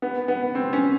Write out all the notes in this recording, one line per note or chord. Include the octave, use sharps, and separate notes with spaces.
B3
B3
C4
C#4